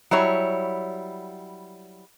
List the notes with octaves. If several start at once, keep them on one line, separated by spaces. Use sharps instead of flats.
F#3 G3 E4 C#5